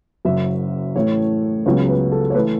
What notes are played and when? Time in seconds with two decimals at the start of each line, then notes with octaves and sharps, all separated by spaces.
0.25 F#1 F#2 F#3 E5
0.96 A1 A2 A3 C#5
1.66 C#2 C#3 F#3 B3 C#5
1.88 B4
2.12 A4
2.30 C#5
2.35 E3 A3 B4